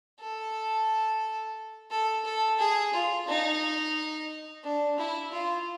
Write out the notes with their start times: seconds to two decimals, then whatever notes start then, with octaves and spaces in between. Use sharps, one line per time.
0.20 A4
1.91 A4
2.25 A4
2.59 G#4
2.93 F4
3.27 D#4
4.63 D4
4.98 E4
5.32 F4